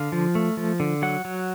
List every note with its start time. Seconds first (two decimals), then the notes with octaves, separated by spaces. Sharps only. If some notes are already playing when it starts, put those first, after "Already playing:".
Already playing: D3 F5
0.12 F3
0.35 A3
0.57 F3
0.80 D3
1.02 F#3 F#5
1.25 F#3